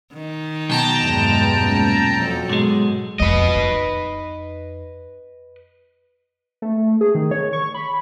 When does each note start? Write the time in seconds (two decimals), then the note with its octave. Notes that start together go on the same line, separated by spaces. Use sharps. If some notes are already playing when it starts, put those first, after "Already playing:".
0.13 D#3
0.70 B1 B2 G5 A5 A#5
0.99 E2 G2 G#3
1.59 A#2 C#4
2.18 F2 F#3 A4
2.49 G#2 B2 G#3
3.20 F1 F2 B4 D#5
3.55 F2 D#4
6.62 A3
7.01 G#4
7.15 D#3
7.31 C#5
7.53 C#6
7.75 B5